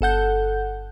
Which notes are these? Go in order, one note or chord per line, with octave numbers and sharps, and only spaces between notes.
G1 A4 F#5 G6